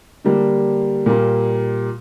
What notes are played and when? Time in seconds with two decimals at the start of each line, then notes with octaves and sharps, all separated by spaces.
0.25 D3 G3 A#3 D4
1.06 A#2 G3 A#3